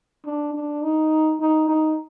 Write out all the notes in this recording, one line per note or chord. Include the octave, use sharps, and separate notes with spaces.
D4
D4
D#4
D#4
D#4